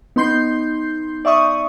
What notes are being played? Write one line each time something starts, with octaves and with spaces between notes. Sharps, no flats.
B3 D#4 C6 G6 C7
D5 E5 C#6 D#6